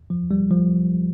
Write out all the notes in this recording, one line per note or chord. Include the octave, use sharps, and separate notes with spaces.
F3
G3
F3